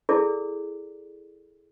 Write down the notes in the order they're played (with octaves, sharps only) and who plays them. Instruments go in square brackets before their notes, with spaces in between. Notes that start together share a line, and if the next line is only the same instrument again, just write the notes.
[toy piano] E4 G#4 A4 D5